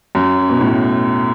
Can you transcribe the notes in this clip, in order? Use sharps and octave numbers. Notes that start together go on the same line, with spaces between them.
F#2
B2
A2